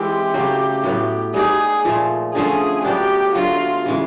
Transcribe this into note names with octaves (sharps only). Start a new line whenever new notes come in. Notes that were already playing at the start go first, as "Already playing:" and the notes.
Already playing: E3 G#3 C4 E4 G4
C#3 F#3 A3
A2 F#3 B3
G3 B3 D#4 G4 G#4
A#2 F3 A3
D3 F3 A3 C#4 G#4
F#3 B3 D4 G4
D3 F#3 A3 F4
C#3 E3 G#3